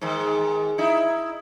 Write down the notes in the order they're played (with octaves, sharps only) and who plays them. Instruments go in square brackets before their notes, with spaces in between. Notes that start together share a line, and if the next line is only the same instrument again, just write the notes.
[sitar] G#2 D#3
D#4 E4